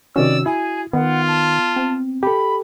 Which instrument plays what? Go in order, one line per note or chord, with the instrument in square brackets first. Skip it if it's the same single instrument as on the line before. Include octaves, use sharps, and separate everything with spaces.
[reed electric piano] C3 D#3 C#4 [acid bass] F#4 [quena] D5 [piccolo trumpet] E6
[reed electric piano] E4 [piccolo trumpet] G#4 [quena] G#5
[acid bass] D#3 [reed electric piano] B3 [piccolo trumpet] F4 [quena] F#5
[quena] A5
[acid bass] C4
[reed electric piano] G4 A4 [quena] B5